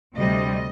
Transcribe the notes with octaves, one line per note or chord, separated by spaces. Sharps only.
D2 C3 G3 D#5